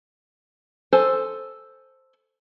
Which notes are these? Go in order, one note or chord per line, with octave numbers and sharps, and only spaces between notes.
A4 C5 G#5